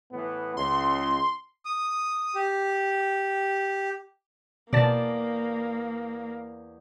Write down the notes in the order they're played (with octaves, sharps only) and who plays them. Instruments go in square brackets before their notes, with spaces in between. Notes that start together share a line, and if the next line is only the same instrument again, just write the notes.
[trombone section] A2 E3 B3
[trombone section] C#2 [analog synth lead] C6
[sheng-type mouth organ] D#6
G4
[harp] E2 D5 [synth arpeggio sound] B2 A5 [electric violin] A#3